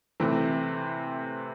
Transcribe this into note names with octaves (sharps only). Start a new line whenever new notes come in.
C3 E3 A3 C4